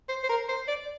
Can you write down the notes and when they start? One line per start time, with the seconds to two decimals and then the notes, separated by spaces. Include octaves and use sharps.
0.09 C5
0.23 C5
0.29 A#4
0.48 C5
0.68 D5